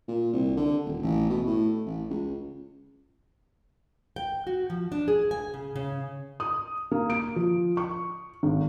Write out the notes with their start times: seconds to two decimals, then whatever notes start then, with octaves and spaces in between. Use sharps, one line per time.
0.08 A#2
0.33 C2
0.57 D3
0.85 D#1
1.03 A1
1.30 B2
1.46 A2
1.86 A1
2.10 C#2
4.16 G5
4.47 F#4
4.70 F3
4.92 D4
5.08 G#4
5.31 G#5
5.54 C#3
5.76 C#3
6.40 D#6
6.91 A#3
7.10 D7
7.36 F3
7.77 C#6
8.43 G#1